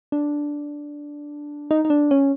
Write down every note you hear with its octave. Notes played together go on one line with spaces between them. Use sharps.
D4
D#4
D#4
D4
C#4